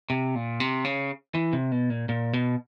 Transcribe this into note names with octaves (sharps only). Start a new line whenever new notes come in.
C3
A#2
C3
C#3
E3
C3
B2
A#2
A#2
B2